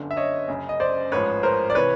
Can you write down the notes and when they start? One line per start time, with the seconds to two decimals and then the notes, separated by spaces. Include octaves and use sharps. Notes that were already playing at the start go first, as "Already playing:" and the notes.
Already playing: G1 F#2 D3
0.11 E5
0.17 C#5 D#5
0.48 F#1 F#2 C#3
0.69 D#5
0.80 C5 D5
1.12 A1 G#2 F3 B4 C#5
1.43 A#4 C5
1.70 D5
1.75 C3 E3 B4 C#5